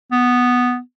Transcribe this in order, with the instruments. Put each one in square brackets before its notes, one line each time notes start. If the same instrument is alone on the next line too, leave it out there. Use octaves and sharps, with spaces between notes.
[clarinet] B3